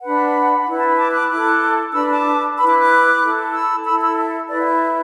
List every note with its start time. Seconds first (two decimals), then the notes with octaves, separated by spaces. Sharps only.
0.01 D4 B4 F#5 B5
0.66 E4 B4
0.76 A5
0.87 B5
0.97 A5 D6
1.13 D6 F#6
1.26 E6
1.29 E4 A4 D6 F#6
1.93 D4 B4 B5 E6
2.09 A5 D6
2.57 E4 B4 B5 E6
2.67 D6 F#6
2.78 D6 F#6
3.21 E4 A4
3.52 B5 E6
3.84 E4 A4 B5 E6
4.00 B5 E6
4.17 E5
4.48 E4 B4 D5
4.59 F#5
4.64 E5